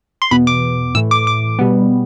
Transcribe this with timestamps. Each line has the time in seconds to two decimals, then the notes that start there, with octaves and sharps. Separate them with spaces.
0.22 C6
0.31 E2 B2 B3 B5
0.47 D6
0.95 A2 E3 A3 E6
1.11 D6
1.27 D6
1.59 B2 G3 B3